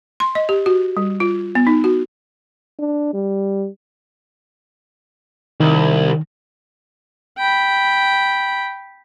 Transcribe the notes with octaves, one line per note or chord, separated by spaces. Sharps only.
C6
D#5
G4
F#4
G3
F4
B3
D#4
F#4
D4
G3
C2 D#3
G5 B5